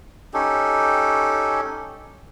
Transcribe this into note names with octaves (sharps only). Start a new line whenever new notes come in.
C#4 D#4 G4 A4